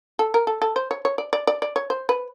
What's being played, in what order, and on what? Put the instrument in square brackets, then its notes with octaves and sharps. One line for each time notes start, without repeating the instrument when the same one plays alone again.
[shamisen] A4
A#4
A4
A4
C5
C#5
C#5
D5
D5
D5
D5
C#5
C5
B4